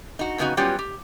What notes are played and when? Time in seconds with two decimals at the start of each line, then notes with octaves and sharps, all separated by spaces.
0.19 D#4 F#4
0.38 F2 C#3 B3 D#4 F#4 A#5
0.57 F#3 G3 B3 C#4 F4 G4
0.79 G4